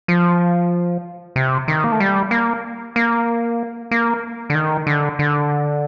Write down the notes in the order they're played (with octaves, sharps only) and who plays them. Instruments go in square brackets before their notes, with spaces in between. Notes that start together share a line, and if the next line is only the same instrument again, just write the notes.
[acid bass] F3
C3
D#3
A#3
A3
G3
A#3
A#3
A#3
D3
D#3
D3
D3